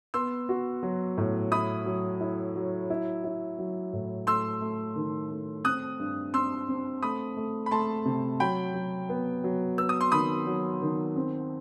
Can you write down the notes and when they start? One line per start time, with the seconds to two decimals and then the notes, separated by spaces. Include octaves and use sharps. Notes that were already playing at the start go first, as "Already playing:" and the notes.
0.14 B3 C6 E6
0.49 F#4
0.83 F#3
1.18 A2
1.51 E4 B5 D#6
1.86 F#3
2.21 E4
2.56 F#3
2.90 E4
3.24 E4
3.59 F#3
3.93 A2
4.27 A3 C6 E6
4.61 A3
4.96 D#3
5.31 A3
5.65 C4 D#6 F#6
6.00 G2
6.33 C4 C6 E6
6.69 C4
7.03 A3 B5 D#6
7.37 A3
7.66 B5
7.71 A3 A5 C6
8.05 C3
8.40 F#3 G5 B5
8.74 F#3
9.09 B3
9.44 F#3
9.78 B3 E6
9.89 D#6
10.01 C6
10.12 D#3 B5 D#6
10.47 F#3
10.81 D#3
11.16 C4